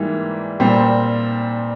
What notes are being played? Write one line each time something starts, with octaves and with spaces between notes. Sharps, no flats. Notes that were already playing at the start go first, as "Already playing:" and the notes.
Already playing: G#2 E3 G3 A#3
A#2 G3 C4